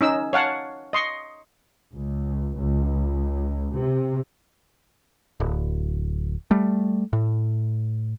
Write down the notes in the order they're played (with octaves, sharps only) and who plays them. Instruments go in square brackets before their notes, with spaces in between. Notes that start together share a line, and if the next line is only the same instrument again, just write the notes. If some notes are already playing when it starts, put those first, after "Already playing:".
[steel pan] C#4 D#4 E6
C#5 F5 F#5 A5
D#5 C6 C#6
[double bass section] C#2
C#2
C3
[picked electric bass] D1
G3 A3
A2